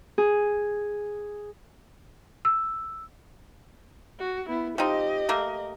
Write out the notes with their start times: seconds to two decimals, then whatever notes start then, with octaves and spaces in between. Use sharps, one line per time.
0.18 G#4
2.45 E6
4.20 F#4
4.49 B3 E4
4.78 F3 C4 D#4 G4 D#5
5.29 A3 A#3 A#4